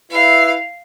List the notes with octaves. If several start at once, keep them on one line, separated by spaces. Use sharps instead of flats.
E4 B4 E5 F5